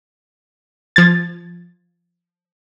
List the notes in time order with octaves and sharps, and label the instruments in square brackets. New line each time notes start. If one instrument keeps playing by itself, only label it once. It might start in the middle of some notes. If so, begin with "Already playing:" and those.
[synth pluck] F3 G#6 A6